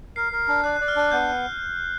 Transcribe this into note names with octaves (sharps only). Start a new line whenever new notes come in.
A#4 C7
A#4
D4
D5 F#6
F#6
D5
F6
D4 F#6
B3 G6